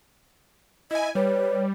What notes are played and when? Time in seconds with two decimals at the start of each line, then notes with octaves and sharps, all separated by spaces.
0.91 E4 D#5 G#5
1.15 G3 B4 C#5